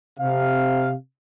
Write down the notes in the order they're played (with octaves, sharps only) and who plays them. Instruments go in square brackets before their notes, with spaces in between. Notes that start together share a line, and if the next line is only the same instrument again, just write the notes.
[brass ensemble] C3 F5